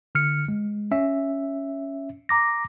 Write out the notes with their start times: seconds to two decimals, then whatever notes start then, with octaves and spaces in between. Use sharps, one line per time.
0.15 D3 F6 C#7
0.48 G#3
0.91 C#4 E5
2.29 A#5 D6 A#6